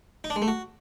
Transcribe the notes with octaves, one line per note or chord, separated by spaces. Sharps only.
D#4
D4
G#3
A3
F#4